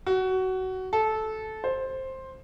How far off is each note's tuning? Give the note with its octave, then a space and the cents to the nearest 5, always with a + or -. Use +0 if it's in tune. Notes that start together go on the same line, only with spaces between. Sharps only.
F#4 +20
A4 -15
C5 +10